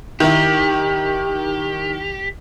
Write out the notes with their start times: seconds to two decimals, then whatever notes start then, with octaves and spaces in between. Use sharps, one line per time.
0.20 D#3 E4 G4